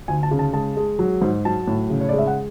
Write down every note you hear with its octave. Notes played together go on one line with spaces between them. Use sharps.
D2 G#5
A5
C#3
A5
G#3 A5
G#3
F#3
G#2
F#3 A5
A2
C#3
C#5
D5
G#3
E5
F#5